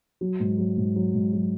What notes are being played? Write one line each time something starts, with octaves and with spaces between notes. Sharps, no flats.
F#3
G#2
F#3
G#2
F#3
G#2
F#3